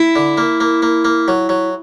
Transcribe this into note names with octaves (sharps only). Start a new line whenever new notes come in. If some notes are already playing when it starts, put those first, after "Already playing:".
Already playing: E4
D3
A#3
A#3
A#3
A#3
F#3
F#3